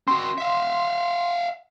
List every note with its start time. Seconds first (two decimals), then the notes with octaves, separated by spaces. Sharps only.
0.08 C4 F#4 C6
0.38 E5 F5